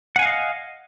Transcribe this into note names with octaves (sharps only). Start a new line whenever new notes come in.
D#5 F5 F#5 G#5